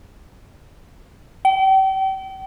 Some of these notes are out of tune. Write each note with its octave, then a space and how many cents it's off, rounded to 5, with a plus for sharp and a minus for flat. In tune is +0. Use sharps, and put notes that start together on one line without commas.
G5 -35